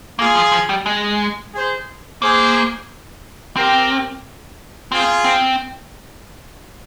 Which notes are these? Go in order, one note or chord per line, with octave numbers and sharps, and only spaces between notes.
A#3 F4 G#4
F3
F3
G3
G#3
G#4 C5
A#3 G#4 C5
C4 G4 A#4
C4 F4 G#4
C4